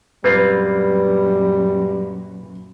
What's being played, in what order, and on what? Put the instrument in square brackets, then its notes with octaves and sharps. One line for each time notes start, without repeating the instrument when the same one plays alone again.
[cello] F#2 A#2 [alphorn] G3 [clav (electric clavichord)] A#3 C4 F4 [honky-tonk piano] B4